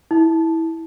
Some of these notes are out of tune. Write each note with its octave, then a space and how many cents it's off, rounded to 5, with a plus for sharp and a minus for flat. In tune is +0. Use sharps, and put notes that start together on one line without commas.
E4 -15